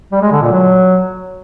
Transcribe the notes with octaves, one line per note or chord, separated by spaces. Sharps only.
G3
G#3
D3
A#2
F#3